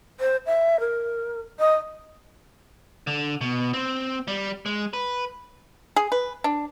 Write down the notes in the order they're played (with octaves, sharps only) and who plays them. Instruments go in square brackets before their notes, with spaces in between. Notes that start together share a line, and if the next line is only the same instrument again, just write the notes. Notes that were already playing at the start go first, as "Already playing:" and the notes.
[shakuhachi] C5
E5
A#4
D#5
[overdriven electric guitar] D3
B2
C4
G3
G#3
B4
[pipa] G#4
B4
D4